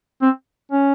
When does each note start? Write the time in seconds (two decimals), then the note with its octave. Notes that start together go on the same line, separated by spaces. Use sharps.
0.22 C4
0.71 C#4